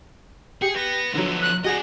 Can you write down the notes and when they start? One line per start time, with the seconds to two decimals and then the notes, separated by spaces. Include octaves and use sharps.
0.62 G4 G#4 C#7
0.75 B3 A#6
1.14 D3 F3 F#3 B3
1.42 F#6
1.64 D4 F#4 G#4 D#5 F#5 A#6